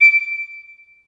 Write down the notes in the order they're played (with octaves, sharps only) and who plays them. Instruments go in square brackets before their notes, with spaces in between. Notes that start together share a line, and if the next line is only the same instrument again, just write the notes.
[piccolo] D7